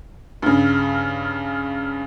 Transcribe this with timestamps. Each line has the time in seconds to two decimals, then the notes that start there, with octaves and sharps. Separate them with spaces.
0.42 G2 C#3